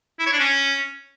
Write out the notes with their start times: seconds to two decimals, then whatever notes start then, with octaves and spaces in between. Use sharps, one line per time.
0.19 E4
0.26 C#5
0.33 D4
0.40 C#4